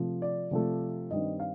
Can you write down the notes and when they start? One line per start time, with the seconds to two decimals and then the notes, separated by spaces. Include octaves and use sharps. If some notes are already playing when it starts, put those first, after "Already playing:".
Already playing: C3 F3 A3
0.22 D5
0.51 C3 F3 A3
1.10 G2 D#3 G3 C4 D#5
1.40 F5